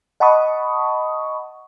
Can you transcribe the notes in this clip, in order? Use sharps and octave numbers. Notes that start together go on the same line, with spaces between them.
D#5 F#5 A5 B5 C#6 D#6